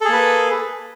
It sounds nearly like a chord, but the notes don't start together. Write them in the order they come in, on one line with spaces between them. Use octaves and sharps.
A4 G#4 A#3 B4